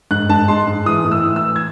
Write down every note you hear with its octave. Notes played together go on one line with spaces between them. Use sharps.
G#2 F#6
G#2 A5
G#3 C6
G#2
E3 D#6
A2
E6
E3
E6
E3
G#6